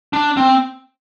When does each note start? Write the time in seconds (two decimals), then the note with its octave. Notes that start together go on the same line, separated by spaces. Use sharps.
0.13 D4
0.37 C4